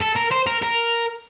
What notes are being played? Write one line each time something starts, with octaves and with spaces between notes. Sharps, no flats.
A4
A#4
C5
A#4
A#4